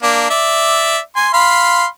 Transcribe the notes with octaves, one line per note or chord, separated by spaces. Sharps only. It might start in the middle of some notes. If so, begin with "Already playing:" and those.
A#3 D4
D5 E5
G#5 C6
F5 B5 C6